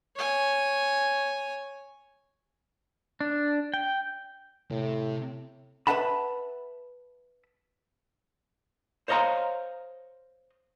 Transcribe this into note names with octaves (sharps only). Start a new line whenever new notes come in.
C#5 G#5
D4
G5
A2 C3
B4 C5 E5 F#5 A5 B5
C5 C#5 D#5 F5 A#5 C6